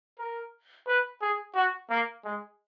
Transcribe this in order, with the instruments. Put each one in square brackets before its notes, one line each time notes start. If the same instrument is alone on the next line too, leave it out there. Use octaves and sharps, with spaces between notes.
[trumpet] A#4
B4
G#4
F#4
A#3
G#3